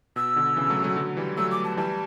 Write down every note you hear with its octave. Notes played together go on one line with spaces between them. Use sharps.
B2 E6
B2 D3
C#3 E3
F#3 A3
F#3 A3
D3 F#3
E3 G3
F#3 A3 E6
D6
A5
E3 G3 A5